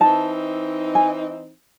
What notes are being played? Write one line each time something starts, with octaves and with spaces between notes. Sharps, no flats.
E3 C4 D#4 A5
G#5